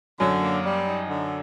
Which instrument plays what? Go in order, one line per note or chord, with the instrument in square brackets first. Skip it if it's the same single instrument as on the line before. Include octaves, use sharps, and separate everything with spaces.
[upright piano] F#2 F#3 [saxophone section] D3
[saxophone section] A#3
G3
D#4
D3